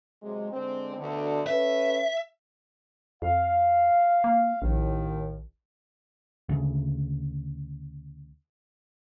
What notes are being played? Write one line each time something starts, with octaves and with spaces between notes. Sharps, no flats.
C3 F#3 G#3
D3 G#3 C4
D2 B2 D3
C#4 A4 B4 E5
F2 F5
A#3
A#1 D#2 A2 D#3
D2 C#3